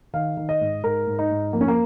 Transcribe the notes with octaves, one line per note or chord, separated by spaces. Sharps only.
D#3 F5
D#3
D#5
G#2
G#2 A#4
G#2
D#4
G#2
F2 A#3
C#4
A#3